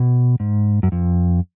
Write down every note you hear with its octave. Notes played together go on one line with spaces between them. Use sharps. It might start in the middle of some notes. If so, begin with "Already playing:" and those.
Already playing: B2
G#2
F#2
F2